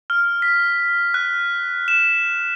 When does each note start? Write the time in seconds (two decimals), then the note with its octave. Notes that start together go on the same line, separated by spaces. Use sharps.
0.10 F6
0.42 B6
1.14 F#6
1.88 E7